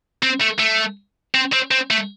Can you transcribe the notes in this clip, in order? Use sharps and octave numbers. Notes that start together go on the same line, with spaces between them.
C4
A3
A3
C4
C4
C4
A3